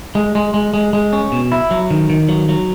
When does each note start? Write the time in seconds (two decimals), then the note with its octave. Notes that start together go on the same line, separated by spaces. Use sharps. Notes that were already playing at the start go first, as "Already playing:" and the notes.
0.15 G#3
0.35 G#3
0.54 G#3
0.74 G#3
0.93 G#3
1.13 C#4
1.32 B2
1.52 E4
1.71 F#3
1.90 D#3
2.10 D#3
2.29 F#3
2.49 F#3